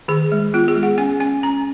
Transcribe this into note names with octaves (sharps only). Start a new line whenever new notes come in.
D#3 G#4
G#3
B3 F4
G#4
G#3
F#5
C#4 G#5
C#4 G#5
C#4 A#5